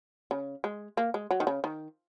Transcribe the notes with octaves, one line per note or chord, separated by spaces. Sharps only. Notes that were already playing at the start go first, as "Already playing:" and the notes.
C#3
G#3
A#3
G#3
F#3
D#3
C#3
D#3